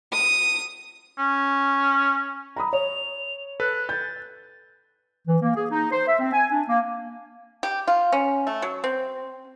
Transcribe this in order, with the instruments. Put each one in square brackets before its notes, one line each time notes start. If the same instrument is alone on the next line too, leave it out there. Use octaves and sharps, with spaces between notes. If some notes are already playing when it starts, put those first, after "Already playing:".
[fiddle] D#6
[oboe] C#4
[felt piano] A#5 B5 D#6
[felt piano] C#5 [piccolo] F7
[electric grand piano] A4 B4 [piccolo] F#6
[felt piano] G6 [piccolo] A6
[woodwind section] E3
A#3
G#4
D#4
C5
E5
C4
G#5
D4
A#3
[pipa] G4
F4
C#4
A3
F#3
C4